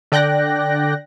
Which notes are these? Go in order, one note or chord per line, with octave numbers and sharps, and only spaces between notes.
D3 D5 G5 F#6 A#6